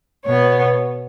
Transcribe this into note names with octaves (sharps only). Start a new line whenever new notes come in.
B2 B3 C#5